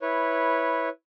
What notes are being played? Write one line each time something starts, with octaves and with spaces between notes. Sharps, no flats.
E4 B4 C#5